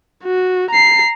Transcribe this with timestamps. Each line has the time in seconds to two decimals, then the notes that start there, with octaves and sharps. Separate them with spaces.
0.24 F#4
0.71 A#5 C7